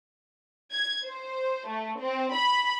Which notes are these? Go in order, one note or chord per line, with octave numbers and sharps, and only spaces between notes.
G#6
C5
A3
C4
B5